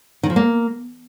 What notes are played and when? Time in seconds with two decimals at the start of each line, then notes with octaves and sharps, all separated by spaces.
0.23 D#3
0.30 F3
0.36 A#3